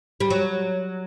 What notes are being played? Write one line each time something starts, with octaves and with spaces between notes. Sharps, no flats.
G3
F#3